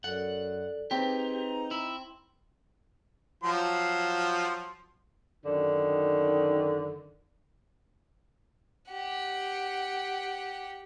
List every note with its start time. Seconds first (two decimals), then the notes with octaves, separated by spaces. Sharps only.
0.04 F#2 A4 D5 F#5
0.91 C4 D#4 G4 G#4 B4 G5
1.71 E4
3.43 F3 F#3 C6
5.45 F#2 D3 D#3
8.92 G4 F#5